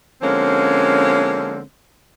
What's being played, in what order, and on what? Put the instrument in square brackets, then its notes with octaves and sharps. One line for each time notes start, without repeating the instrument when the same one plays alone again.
[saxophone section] D3 F3 G#3 A#3 C4 C#4